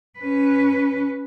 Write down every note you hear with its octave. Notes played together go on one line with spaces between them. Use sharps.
C#4 B4